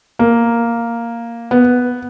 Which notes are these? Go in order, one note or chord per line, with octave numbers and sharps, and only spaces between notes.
A#3
B3